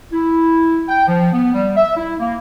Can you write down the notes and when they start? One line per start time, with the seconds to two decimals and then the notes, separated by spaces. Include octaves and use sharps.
0.11 E4
0.88 G5
1.07 F3
1.33 B3
1.54 G3
1.75 E5
1.96 E4
2.19 A#3